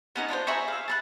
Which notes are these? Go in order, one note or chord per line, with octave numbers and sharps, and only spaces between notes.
B3 C#4 D#4
D4 F4 A#4 C5
G#4 E5 A#5 C#6
F5 E6
A5 A#5 F#6